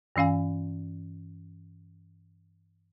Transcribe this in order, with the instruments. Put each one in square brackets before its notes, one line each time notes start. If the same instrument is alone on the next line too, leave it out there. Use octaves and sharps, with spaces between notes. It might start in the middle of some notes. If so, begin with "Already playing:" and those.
[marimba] G2 E3 C#4 F5 G#5